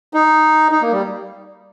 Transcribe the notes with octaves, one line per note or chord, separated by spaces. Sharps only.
D#4
D#4
A#3
G3